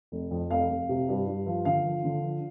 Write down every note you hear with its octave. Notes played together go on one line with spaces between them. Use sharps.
F1
F2
F1 F5
F1
C3
G2
G2
F3
D3 F5
F3
D3
F3